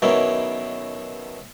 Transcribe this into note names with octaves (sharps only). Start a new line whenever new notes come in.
B1 B2 D#3 C#4 E4 A#4